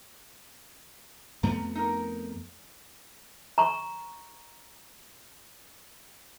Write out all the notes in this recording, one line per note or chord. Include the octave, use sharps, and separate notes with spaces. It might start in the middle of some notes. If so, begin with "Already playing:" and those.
F2 A3 B3 A#5
D#4 A#4
A#5 C#6